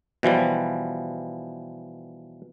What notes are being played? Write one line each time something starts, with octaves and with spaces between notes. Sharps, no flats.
B2 E3 F3 G3